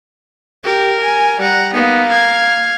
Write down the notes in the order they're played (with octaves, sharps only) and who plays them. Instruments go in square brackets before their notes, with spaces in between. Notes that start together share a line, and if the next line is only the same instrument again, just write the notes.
[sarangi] G4 [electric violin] A#4
[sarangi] G#5
[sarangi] G3 [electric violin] F#5 A#5
[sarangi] A#3 [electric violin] B3 D#4
[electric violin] F5 G#6